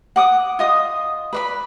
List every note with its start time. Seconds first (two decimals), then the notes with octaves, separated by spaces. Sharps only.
0.16 F#5 D6 D#6
0.59 F4 D#5 D#6
1.33 B4 D5 B5